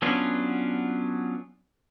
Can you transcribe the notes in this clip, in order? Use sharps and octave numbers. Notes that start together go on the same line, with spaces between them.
F#3 B3 C#4 D4 F4